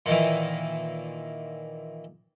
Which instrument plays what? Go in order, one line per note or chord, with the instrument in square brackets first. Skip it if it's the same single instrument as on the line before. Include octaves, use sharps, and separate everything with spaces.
[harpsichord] A#2 D#3 E3